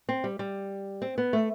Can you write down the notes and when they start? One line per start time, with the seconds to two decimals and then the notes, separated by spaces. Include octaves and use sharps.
0.09 C4
0.24 G3
0.39 G3
1.02 C4
1.18 B3
1.33 A3